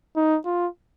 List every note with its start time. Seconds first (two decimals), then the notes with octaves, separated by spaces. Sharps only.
0.16 D#4
0.46 F4